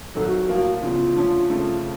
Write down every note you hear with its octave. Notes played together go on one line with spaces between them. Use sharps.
C2 C3 D#3 F#3 A4
F#4
F#4
A2 F3 A#3 F#4
F#1 E2 C#3 F4
D3 F3 A3 C#4
F2 C#3 F3 A3